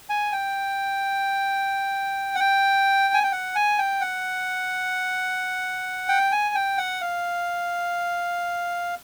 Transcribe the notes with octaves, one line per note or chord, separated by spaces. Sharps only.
G#5
G5
F#5
G5
G#5
G5
F#5
G#5
G5
F#5
G5
G#5
G5
F#5
F5